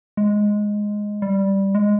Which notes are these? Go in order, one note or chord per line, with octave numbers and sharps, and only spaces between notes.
G#3
G3
G#3